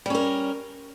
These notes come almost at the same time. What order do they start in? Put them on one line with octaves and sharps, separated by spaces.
G3 C#4 A#4